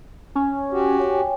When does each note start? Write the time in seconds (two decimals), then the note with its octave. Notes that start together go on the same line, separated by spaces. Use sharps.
0.35 C#4
0.71 F#4 G4
0.99 C#5 G5 G#5